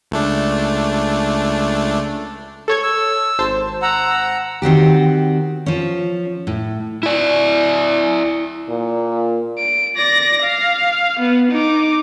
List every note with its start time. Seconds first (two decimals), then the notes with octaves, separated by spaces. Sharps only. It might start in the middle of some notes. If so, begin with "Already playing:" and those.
0.11 C#2 A3 D4
2.68 A4 C#5 G#6
2.83 E6
3.39 G#1 C5 A5
3.82 F#5 A#5 E6
4.62 D#3 C4 F#4 G4
5.66 F3 C#4
6.47 A2
7.03 E4 D5
8.70 A#2
9.58 D7
9.97 D5 A#6
10.42 F5
11.19 B3
11.51 D#4 D6